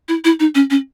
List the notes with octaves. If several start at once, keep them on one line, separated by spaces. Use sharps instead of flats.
E4
E4
D#4
C#4
C#4